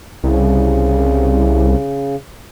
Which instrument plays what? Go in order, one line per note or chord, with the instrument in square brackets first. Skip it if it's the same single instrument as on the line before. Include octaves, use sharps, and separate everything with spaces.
[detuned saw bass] C2 [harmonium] C#3